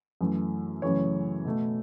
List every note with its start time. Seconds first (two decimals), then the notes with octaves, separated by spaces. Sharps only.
0.21 F#2 E3 A3
0.82 F#2 C#3 E3 A3 C#5
1.45 B2 A3